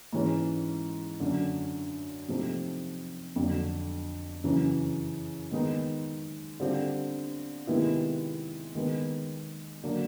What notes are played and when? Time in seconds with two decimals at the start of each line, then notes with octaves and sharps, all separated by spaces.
0.13 G#2 E3 G#3 C#4
1.20 F#2 D3 F#3
2.28 C3 F3 A3 C4 D#4
3.36 F2 D3 F#3
4.44 F#2 C#3 E3
5.51 D#3 G#3 B3 D#4
6.60 D3 G3 C4 F4
7.67 C3 D#3 G#3 B3 E4
8.75 D#3 G#3 B3
9.84 D3 F#3 A#3 D4